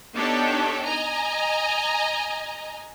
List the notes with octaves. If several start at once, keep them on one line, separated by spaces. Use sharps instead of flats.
B3 D4 D#4 G4 A4 C#5
D#5 G#5 A#5